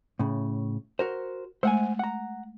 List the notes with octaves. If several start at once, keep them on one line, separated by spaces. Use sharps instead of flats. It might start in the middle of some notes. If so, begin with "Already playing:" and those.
A2 C#3
F#4 A#4 C5
G#3 A3 C5 F#5 G#5
F#5 A#5